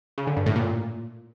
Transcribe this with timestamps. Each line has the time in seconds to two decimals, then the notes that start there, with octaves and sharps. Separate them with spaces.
0.18 C#3
0.27 D3
0.37 G2
0.46 A2
0.56 A#2